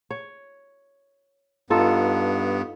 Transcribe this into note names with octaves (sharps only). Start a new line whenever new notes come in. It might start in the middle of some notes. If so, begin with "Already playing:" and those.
C#5
G2 B3 D#4 F4 A4